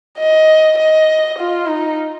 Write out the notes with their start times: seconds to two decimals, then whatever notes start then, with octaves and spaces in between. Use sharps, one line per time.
0.19 D#5
0.78 D#5
1.39 F4
1.69 D#4